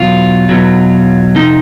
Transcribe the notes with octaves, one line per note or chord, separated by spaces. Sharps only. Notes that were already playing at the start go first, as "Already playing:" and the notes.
Already playing: E2 B2 F#3 F4
E2 B2 F#3
F2 C3 F3 D#4